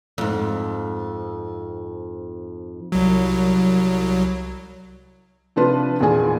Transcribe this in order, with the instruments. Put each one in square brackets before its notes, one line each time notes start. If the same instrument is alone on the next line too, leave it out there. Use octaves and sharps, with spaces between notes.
[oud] F2 G#2
[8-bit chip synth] C2 F#3
[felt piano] C3 F3 D4 F4 B4
E2 A#2 D#3 G#4 G#5